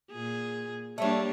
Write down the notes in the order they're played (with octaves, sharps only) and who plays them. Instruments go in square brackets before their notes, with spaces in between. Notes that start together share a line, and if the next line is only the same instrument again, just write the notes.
[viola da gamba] A#2 G#4
[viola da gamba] G3 A#3 D4 [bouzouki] A3 C#5